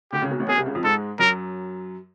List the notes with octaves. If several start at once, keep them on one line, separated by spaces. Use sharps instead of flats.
D2 D3 G4
C#2 C#3
B1 B2
A1 A2
B1 B2 G#4
C2 C3
C#2 C#3
F2 F3
G#2 G#3 A4
F#2 F#3 A#4